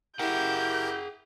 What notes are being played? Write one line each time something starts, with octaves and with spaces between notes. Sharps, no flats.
E4 G4 G#4 A#4 F#5 G5 G6